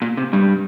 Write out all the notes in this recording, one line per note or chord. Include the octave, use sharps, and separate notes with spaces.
A#2
C3
G2 G3